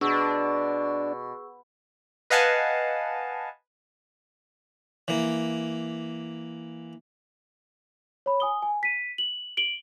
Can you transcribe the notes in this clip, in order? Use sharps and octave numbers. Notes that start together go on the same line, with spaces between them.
B2 D4 G#4 C#6 E6
B4 D#5 F5 F#5 G#5 A5
E3 A#3
C#5 B5
G#5 D#6 G7
G#5
B6 D#7
F#7
D7 F#7 G7